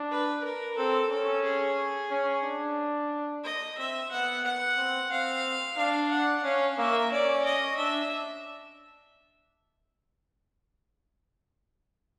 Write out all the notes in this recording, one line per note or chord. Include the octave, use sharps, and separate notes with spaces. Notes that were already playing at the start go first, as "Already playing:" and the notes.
Already playing: D4
B4
A#4
C4 A4
C#4 A4
G#4
C#4
D4
D#5
C4 E5
B3 F#5
F#5
C4
C4 F5
D4 F5
F#5
C#4 F5
A#3 E5
C#4 D5
D#5
D4 E5